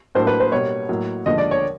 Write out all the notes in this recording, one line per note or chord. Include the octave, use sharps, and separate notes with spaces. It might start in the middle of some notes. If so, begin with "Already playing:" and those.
A2 F#3 A#3 D4 C5
B4
C5
B2 G3 A#3 C#5
A2 F#3 A#3
D#2 D3 F3 G#3 D#5
D5
C#5